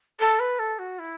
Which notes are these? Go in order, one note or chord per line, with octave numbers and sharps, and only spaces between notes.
A4
B4
A4
F#4
E4